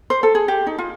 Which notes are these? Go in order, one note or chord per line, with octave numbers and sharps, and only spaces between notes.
C5
A4
G#4
G4
D#4
F4